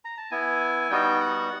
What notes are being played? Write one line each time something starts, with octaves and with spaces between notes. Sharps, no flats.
A#5
A5
B3 E4 G#5
G3 B3 D#4 F#4 G5
F#5